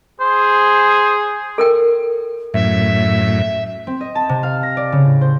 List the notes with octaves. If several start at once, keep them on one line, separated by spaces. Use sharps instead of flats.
G#4 C5
A4 A#4 G5
F#2 A2 E5
C4
D#5
A5
C3
F5
A#6
D5
C#3
A2
C5